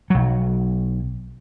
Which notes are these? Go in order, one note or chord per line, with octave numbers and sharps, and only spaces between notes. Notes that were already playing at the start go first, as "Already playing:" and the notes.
B1 F#3